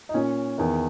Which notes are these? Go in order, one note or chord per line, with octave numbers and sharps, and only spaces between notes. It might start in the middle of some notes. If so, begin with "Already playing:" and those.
D#4
A#2 C#4
E2 D#3